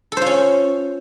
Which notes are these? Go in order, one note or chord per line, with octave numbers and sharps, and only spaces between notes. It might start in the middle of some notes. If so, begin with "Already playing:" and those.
C#4 F4 A4 C5